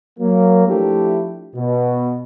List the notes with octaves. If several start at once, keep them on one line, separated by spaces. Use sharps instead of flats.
F#3 A#3
F3 A3 D4 E4 G4
B2